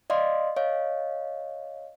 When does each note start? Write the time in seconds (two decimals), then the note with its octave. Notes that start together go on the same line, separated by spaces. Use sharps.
0.10 D5 D#5 F5 C6
0.57 C#5 D#5 F5